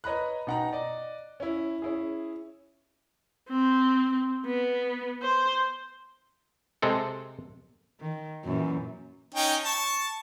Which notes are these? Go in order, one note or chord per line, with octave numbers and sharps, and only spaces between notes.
B4 C#5 D#5 A#5 B5 F#6
B2 D#4 F#5 G5 A#5
D5 D#5
C#4 E4
C#4 E4 G#4
C4
B3
C5
C3 G#3 C4 A4
D#3
F#2 A#2 E3
C#4 D#4 G5
A5 C#6